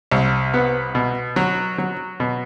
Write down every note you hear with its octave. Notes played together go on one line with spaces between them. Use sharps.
C2
B3
B2
F#3
F#3
B2